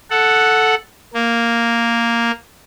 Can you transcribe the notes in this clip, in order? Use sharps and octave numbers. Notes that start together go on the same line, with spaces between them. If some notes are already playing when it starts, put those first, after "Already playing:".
A4 F#5
A#3